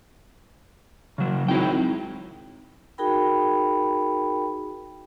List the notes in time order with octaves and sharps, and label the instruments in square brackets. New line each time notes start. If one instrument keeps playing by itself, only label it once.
[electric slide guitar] C#3 F#3
[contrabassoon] G#1 [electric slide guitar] F#3 E4 G5
[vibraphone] D#4 F#4 G#4 A#4 G5 B5